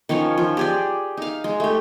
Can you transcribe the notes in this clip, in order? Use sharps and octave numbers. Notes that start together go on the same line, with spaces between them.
D#3 F3 C#4 C#5
F3
G4 G#4 D5
D#4 F5
G#3
A3 G4